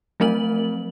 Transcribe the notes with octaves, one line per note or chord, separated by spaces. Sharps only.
F3 F#3 A3 C4 A#4 F#7